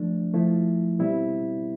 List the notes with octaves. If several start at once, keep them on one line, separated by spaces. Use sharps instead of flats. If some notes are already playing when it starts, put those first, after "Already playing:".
Already playing: F3 A3 D4
F3 A3 E4
B2 G3 C4 E4